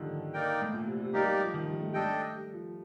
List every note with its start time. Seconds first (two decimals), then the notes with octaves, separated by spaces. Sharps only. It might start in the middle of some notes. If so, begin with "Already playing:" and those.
Already playing: A#2 D3 D#3 F3 G3
0.34 A#3 D#4 A#4 D5 G5
0.62 A2
0.74 A#2
0.87 C3
1.01 C3
1.13 G3 A#3 D#4 G4 A#4 D5
1.24 G3
1.34 G3
1.43 F3
1.54 D#3
1.67 G3
1.80 A3
1.89 G3
1.94 A3 D4 A4 D#5 G5
2.34 G3
2.53 F3